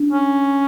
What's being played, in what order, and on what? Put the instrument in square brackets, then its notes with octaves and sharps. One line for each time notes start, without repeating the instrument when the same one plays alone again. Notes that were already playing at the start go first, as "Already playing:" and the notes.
Already playing: [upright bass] D4
[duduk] C#4